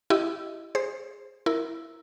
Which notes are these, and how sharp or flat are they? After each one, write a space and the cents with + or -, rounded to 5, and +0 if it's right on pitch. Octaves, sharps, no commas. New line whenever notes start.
E4 +10 G4 -20 D#5 +10
G#4 -10 C5 +0
E4 +0 A#4 +0